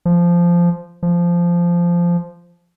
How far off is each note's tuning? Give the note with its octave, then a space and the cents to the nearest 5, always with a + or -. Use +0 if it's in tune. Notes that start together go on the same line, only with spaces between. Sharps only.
F3 -10
F3 -10